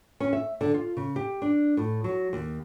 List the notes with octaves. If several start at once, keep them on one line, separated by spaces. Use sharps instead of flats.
C#4
E5
D3
F4
C#3
G4
D4
A2
F#3
D#2